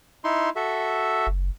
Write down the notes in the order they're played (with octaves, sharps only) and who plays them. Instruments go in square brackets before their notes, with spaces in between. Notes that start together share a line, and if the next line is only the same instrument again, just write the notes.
[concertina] D#4 E4 C6
F#4 A4 E5
[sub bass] F#1